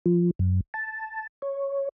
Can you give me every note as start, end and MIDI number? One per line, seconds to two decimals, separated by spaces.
0.06 0.31 53
0.39 0.60 42
0.74 1.27 81
1.42 1.89 73